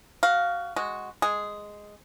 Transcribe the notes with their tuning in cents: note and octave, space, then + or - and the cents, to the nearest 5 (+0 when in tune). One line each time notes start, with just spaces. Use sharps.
F#4 +20 F5 +0
G#3 +0 F#4 +0
G#3 +0 G#4 +0